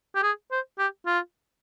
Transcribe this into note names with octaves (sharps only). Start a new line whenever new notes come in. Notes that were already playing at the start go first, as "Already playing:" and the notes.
G4
G#4
C5
G4
F4